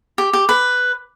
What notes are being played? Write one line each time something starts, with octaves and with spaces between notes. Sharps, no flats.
G4
G4
B4